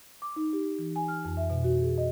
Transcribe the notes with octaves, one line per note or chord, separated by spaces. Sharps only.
D6
D#4
G4
E3
G#5
F6
F2
E5
B2
F#4
G#4
D#5